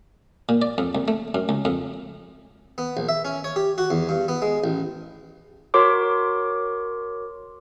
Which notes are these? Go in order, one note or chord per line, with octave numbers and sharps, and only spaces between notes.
A#2
D5
F2
C2
A3
F#2
C#2
F2
B3
A#1
E5
C#4
C#5
G4
F#4
E2
G2
B3
G#3
A1
F#4 A#4 C#5 C6 D6